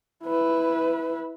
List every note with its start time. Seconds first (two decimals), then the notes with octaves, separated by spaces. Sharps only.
0.24 E4 B4